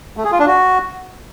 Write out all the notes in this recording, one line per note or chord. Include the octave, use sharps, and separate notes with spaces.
A3
G#4
F4
D4
F#4